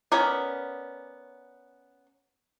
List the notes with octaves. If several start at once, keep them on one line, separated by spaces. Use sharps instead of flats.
B3 C#4 A#4 D5